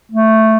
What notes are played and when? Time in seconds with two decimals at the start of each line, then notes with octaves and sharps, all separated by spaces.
0.12 A3